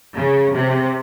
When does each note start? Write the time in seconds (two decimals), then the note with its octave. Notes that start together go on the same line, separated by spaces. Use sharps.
0.17 C#3
0.54 C3